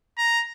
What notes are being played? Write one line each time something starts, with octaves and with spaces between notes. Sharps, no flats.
A#5